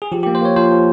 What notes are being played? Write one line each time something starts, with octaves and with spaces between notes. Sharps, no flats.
G#4
F3 G4
A#3 G4
C5
A#3 C#5
F3 C5
F3